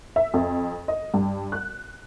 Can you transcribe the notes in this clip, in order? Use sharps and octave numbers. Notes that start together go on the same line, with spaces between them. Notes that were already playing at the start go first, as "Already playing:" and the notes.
E5
F2
D#5
G2
F#6